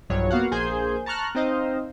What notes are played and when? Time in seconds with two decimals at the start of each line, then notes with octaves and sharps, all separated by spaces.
0.10 B1 G2 F3 F#3 C#5
0.31 A#3 B3 F#4 F5 F#5
0.51 A#1 A#3 G#4 C5 G#5 G6
1.06 A5 A#5 C#6 F6 F#6
1.35 C4 D#4 C5 D#5 F5